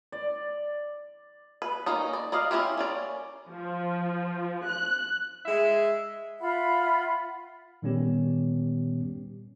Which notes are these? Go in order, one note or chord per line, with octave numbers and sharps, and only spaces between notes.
D5
B4
A#3 C#4 D#4
D5
A#3 D5 D#5 F5
C#4 E4 F4 G4
A#3 C#4 D5
F3
F#6
G#3 E5
F4 E5 F#5 B5
A#2 D#3 G3 B3 C#4 G4